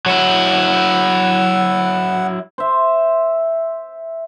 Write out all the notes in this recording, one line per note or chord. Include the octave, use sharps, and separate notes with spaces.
F#3 E4 F#5
C5 E5